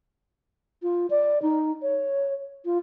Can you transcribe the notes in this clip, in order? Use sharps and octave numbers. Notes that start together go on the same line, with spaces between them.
F4
D5
D#4
C#5
F4